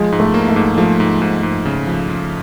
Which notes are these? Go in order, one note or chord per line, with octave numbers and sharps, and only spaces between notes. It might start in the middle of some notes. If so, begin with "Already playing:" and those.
Already playing: F3 G#3
G#2
A3
A#3
A3
G#2
F3 A3
G#2
G#2
G#2
C#3
F3
F3